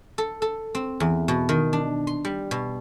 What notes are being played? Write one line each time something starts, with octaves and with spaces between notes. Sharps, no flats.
A4
A4
C4
E2
B2
D#3
D4
C6
G3
B2